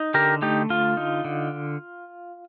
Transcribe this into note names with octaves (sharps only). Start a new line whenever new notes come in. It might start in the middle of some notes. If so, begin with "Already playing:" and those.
Already playing: D#4
D3 G4 A#4
A3 D#4 G4
D3 F4
D#4
D3